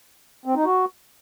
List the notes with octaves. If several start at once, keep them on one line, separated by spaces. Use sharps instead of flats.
C4
D#4
F#4